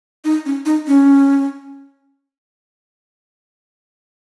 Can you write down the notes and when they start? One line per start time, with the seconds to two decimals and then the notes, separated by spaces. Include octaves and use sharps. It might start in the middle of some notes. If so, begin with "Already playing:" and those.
0.24 D#4
0.45 C#4
0.66 D#4
0.87 C#4